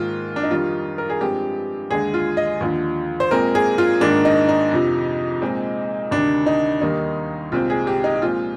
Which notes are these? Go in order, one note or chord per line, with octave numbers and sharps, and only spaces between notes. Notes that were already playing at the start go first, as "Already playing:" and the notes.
Already playing: G#2 D#3 A#3 F4
D4
D#4
F2 D#3 G3 F4
A#4
G#4
G2 F3 G#3 C4 G4
D#2 D3 G#3 G#4
F4
D#5
D#2 D3 F3
C5
A#2 G#3 C4 A#4
G#4
F4
G#2 D#3 A#3 D4
D#4
D#4
F2 C3 F3
A#2 G#3 C4
D2 C3 D#3 D4
D#4
D#2 D#3 G3 A#3 D#4
C2 A#2 G#3 C4 F4
G#4
G4
D#4
G4
A#2 F3 G#3 C4 F4